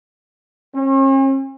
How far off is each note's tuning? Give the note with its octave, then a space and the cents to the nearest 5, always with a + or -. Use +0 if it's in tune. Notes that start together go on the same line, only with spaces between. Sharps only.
C#4 -45